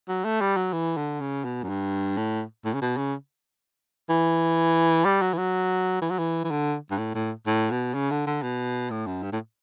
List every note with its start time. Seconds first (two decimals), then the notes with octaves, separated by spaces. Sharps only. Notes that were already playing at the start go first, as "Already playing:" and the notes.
0.08 F#3
0.25 A3
0.41 G3
0.57 F#3
0.73 E3
0.97 D3
1.21 C#3
1.44 B2
1.63 F#2
1.69 G2
2.17 A2
2.65 A2
2.74 C#3
2.81 B2
2.97 C#3
4.09 E3
5.05 G3
5.22 F#3
5.33 E3
5.38 F#3
6.02 E3
6.10 F#3
6.18 E3
6.44 E3
6.51 D3
6.91 G2
6.98 A2
7.15 A2
7.47 A2
7.71 B2
7.94 C#3
8.11 D3
8.27 D3
8.42 B2
8.91 A2
9.07 F#2
9.23 G2
9.32 A2